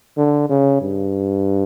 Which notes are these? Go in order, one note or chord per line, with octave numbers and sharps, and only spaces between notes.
D3
C#3
G2